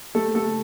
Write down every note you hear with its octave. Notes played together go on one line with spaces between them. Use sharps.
A3 A4
A3 A4